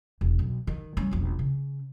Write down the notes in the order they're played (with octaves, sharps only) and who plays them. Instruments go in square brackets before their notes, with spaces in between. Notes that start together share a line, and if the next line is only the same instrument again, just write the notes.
[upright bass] E1
B1
D#3
G3 C#4
E1 A#1
C#3